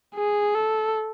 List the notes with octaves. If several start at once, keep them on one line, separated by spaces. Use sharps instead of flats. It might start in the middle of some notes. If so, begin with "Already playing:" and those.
G#4
A4